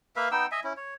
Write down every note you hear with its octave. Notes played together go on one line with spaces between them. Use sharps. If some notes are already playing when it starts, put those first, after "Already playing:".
A#3 B4 E5 F5
B3 D#4 G5 E6
D#5 E5 G#5
C#4 E4
C#5